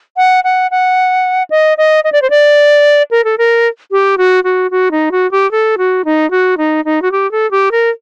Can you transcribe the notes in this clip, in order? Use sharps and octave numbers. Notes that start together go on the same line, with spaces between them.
F#5
F#5
F#5
D#5
D#5
D#5
D5
C5
D5
A#4
A4
A#4
G4
F#4
F#4
F#4
D#4
F#4
G4
A4
F#4
D#4
F#4
D#4
D#4
F#4
G4
A4
G4
A#4